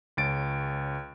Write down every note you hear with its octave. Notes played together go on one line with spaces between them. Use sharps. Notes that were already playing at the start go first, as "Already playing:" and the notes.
C#2 C#4 A6 D7